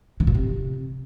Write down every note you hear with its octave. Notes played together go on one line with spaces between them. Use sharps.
D3
A#2
C3